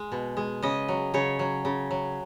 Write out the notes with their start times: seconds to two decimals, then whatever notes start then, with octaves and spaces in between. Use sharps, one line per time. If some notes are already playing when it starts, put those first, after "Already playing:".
Already playing: G#3
0.12 B2
0.37 G#3
0.63 C#3 D#5
0.88 F#3
1.14 C#3 C#5
1.39 F#3
1.65 C#3
1.91 F#3